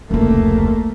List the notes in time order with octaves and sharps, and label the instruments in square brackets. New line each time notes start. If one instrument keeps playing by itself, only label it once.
[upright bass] F1 C#2 [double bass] A3 A#3